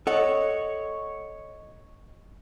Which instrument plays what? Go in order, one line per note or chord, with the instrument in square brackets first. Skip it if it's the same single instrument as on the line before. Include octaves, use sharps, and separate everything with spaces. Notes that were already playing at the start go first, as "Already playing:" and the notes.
[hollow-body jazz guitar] A4 F#5 [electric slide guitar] C#5 [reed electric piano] D#5